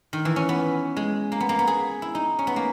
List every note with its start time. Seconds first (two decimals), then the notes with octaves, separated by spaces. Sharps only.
0.13 D#3
0.25 E3
0.36 C#4
0.49 B3
0.96 G#3
1.32 A#3
1.40 B3
1.49 A#3
1.59 B3
1.67 G#4
2.02 E4
2.15 D#4
2.39 C#4
2.47 B3
2.56 A#3